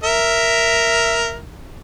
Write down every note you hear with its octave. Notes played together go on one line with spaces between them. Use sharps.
A#4 E5